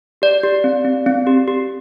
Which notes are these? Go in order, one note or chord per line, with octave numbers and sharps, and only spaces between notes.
G4 D5
G4
C4
C4
C4
G4
G4